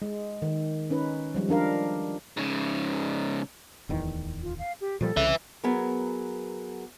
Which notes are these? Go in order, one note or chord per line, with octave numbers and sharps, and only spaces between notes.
G#3
D#3
C#4 D#4 B4
F3 G3 G#3
F3 D4 A#4 F5
G#2 C#3
D1 E2 D#3
F4
F5
G4
A#2 F3 G3 A4
C2 C#3 B4 E5
F#3 B3 G#4 A#4